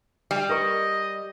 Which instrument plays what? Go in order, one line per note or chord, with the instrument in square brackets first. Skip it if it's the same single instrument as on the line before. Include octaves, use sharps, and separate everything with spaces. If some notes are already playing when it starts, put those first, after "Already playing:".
[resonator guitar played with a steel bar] G3
[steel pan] A#4 B4 C#6 [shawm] D#5